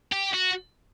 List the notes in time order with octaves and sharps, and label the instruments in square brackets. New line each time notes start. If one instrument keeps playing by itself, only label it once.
[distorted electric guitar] G4
F#4